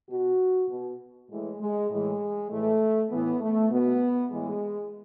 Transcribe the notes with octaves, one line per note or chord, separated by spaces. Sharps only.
B2 F#4
B2
A2 E3 G#3
G#3
A2 E3 G#3
A2 E3 A3
A2 E3 B3
A3
B2 B3
A2 E3 G#3